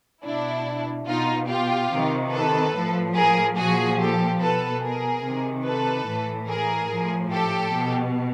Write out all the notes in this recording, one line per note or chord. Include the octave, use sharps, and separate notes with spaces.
B2 D4 E4
B2 D#4 F4
F4 G4
C3 D#3
A4 B4
A2 F3
G#4 A#4
A#2 F3 F#4 G#4
G4 A4
B2 A4 B4
G#4 A#4
C3 D#3
A4 B4
A2 E3
G#4 A#4
A2 F3
G4 A4
B2